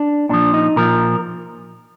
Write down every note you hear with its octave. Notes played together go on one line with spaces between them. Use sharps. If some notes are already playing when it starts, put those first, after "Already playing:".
Already playing: D4
A#2 F3 D4
D#4
A#2 F3 A#4